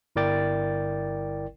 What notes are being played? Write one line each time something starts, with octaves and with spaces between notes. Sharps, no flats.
G1 E4 A#4 D5 G5 A6